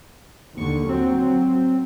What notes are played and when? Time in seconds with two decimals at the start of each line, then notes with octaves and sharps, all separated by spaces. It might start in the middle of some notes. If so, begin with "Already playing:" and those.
0.58 D#2 D3 C#6
0.89 F#3 C4